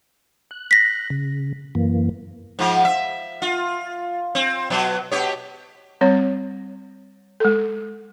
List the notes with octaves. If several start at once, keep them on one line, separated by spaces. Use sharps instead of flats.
F#6
A#6 B6
C#3
F#2 E3 A#3
G#2 F3
E5
F4
C4
B2 F#3
B2 G4 C#5
G3 C4 C#5
G#3 A4